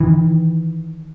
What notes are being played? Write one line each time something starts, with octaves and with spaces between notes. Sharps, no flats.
D#3 E3